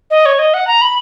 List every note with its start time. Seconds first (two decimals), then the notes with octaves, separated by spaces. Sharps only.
0.11 D#5
0.25 C#5
0.39 D#5
0.54 F#5
0.67 A#5
0.81 B5